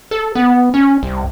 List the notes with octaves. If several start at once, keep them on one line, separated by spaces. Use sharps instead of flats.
A4
B3
C#4
C2